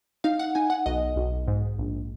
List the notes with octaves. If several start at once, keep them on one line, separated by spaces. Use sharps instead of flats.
D#4 F5
F#5
D#4 G#5
F#5
B1 D#5
B1
G#2
A#1